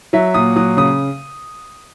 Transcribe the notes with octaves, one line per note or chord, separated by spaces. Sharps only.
F#3 E5
A#2 D#6
F#3 D#6
C#3 D#6